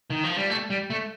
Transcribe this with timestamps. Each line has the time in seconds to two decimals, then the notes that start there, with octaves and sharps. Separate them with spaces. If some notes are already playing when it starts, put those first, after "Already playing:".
0.10 D#3
0.24 F3
0.37 G3
0.50 A3
0.70 G3
0.90 A3